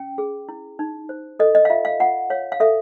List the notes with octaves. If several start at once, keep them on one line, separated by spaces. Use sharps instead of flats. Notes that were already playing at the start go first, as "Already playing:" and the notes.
Already playing: C#4 G5
G#4
E4
D#4
C5
A4 D#5
D#5
F5
F4 E5
F5
F4 F#5
C#5 F5
F5
A4 E5